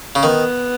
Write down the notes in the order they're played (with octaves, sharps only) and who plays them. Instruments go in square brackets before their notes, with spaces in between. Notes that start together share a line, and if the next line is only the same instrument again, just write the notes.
[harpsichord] C#3
[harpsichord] D#3 [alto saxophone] B3